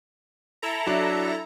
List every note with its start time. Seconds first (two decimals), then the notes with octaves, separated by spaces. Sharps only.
0.62 E4 A4 A#5
0.86 F#3 D4